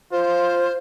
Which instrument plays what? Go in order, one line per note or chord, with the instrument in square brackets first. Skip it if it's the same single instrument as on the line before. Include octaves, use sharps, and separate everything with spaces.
[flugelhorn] F4 [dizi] C5